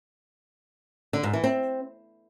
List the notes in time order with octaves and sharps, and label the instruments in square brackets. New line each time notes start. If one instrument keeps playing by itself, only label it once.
[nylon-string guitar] D3
G#2
E3
C4